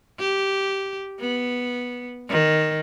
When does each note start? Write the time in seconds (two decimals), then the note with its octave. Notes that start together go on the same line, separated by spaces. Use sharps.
0.19 G4
1.20 B3
2.29 D#3